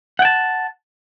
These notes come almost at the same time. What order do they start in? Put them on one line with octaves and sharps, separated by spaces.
F#5 G5 A5